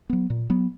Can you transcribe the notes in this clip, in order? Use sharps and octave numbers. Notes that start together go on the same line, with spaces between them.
F#3 B3
A#2
F#3 B3